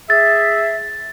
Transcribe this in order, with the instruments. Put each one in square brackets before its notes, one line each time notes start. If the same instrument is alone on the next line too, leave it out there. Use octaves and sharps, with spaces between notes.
[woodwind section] G#4 E5 [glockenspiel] A6